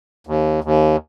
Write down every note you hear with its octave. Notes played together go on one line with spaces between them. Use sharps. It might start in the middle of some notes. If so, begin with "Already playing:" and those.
D#2
D#2